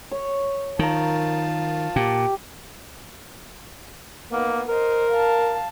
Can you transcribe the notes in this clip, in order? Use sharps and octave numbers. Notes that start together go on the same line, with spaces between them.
C#5
D#3 F4 A#4 A5 A#5
A#2 G4
A#3 B3 D#4
A#4 C5 D#5
F5 A5